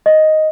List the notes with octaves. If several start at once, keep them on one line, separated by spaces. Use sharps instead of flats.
D#5